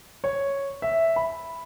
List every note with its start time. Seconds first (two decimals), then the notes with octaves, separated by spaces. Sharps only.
0.24 C#5
0.82 E5
1.16 B5